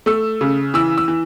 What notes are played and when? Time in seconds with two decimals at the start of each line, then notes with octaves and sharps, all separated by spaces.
0.06 A3 E6
0.41 C#3
0.74 E3 E6
0.98 E6
1.08 E3